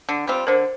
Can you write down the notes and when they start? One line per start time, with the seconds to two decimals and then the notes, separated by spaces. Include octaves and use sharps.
0.09 D3
0.27 G3 C4 F4
0.47 D3 A#4 C5